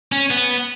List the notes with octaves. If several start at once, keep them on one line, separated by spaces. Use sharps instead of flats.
C#4
B3